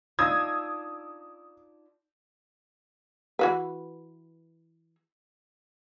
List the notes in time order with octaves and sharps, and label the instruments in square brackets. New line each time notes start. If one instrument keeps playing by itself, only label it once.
[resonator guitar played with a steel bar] D4 D#4 F4 [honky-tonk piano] D#6 E6 G#6
[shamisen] E3 F#4 B4